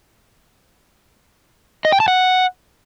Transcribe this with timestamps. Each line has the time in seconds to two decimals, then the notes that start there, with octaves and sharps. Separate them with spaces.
1.85 D#5
1.92 G5
2.00 A5
2.08 F#5